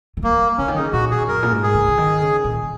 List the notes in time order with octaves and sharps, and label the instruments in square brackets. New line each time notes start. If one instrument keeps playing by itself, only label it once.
[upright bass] D#3
[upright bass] F#3 [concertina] A#3
[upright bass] C#3 [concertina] C#4
[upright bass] D#3
[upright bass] C#3 [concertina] D#4
[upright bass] A#2 [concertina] F#4
[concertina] G#4
[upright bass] F#2 [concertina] A#4
[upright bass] A#2
G#2
[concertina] G#4
[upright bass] C#3
C#3
D#3
C#3
A#2